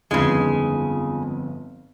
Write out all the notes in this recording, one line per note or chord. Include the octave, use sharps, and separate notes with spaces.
G1 F2 C#3 G#3 D#4